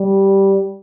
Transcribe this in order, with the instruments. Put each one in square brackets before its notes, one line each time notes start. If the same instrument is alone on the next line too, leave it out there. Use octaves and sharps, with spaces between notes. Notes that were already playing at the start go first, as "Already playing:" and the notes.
Already playing: [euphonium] G3